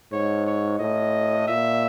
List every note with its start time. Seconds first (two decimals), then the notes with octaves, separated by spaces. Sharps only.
0.12 G#2 C#5
0.46 C#5
0.79 A2 D#5
1.48 A#2 E5